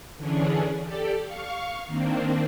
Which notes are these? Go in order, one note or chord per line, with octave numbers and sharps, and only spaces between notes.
D3 E3 C#4 D4 G#4
G4 A4 D5
F5 C#6
D#3 A#3 C4 D4